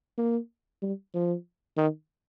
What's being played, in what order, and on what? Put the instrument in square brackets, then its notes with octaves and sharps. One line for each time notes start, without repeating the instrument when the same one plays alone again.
[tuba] A#3
G3
F3
D#3